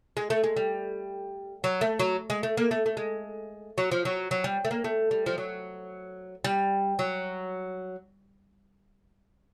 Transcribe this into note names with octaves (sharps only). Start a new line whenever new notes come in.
G#3
A3
G#3
G3
F#3
A3
F#3
G#3
A3
A#3
A3
A3
G#3
F#3
F3
F#3
F#3
G3
A3
A#3
A3
G3
F3
F#3
G3
F#3